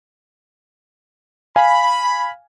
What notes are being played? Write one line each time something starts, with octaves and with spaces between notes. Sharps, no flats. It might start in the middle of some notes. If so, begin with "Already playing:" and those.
F5 G#5 B5